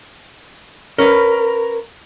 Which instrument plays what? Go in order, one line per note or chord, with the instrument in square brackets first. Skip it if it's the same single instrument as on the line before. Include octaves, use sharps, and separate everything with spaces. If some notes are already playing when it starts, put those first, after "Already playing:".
[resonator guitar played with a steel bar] C#4 B4 [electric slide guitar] A#4